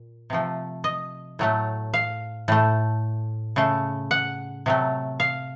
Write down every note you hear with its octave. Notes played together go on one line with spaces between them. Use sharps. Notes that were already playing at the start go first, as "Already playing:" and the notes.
Already playing: A#2
C3 F3 A3
D#5
A2 F#3 A3
F5
A2 A3
C#3 A3
F#5
C3 F#3 A3
F5